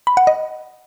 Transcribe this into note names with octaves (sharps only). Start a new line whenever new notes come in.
B5
F#5
D#5